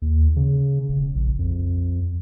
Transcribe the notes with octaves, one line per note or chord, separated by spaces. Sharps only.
D#2
C#3
E1
A#1
F2